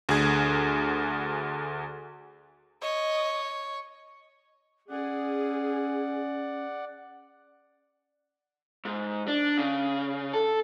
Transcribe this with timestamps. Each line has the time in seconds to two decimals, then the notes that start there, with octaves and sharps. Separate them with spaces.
0.09 D2 D3 G#4 G#6
2.82 C#5 D#5
4.90 C#4 G#4 D5 F#5
8.85 G#2
9.28 D4
9.58 C#3
10.33 A4